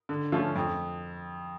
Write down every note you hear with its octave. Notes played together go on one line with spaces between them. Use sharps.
D3
F3 A3 C#4 F4
F2